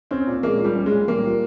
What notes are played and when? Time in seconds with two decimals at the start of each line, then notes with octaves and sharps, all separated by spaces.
0.11 C4 C#4
0.27 A#2
0.43 G#3 A#3
0.59 F4
0.64 G3
0.76 C#4
0.86 G#3
0.91 A#2
1.08 G3 A#3
1.24 F4